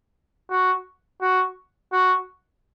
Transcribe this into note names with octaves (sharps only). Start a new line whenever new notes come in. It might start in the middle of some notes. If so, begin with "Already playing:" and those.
F#4
F#4
F#4